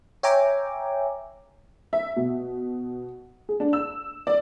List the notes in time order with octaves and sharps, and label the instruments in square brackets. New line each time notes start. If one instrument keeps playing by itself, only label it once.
[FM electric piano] C#5 E5 G5 G#5 A#5 D6
[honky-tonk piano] E5
B2
G#4
D4
E6
D5